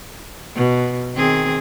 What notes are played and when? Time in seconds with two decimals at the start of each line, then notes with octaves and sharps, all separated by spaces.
0.56 B2
1.14 D#3 C4 G#4